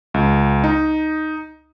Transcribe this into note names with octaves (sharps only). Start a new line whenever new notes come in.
C#2
D#4